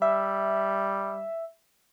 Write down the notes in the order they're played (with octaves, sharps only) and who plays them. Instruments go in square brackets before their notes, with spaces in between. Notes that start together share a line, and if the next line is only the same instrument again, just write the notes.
[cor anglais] G3 [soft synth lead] E5